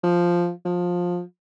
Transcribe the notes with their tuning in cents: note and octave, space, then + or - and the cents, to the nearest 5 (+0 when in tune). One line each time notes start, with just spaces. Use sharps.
F3 +0
F3 +20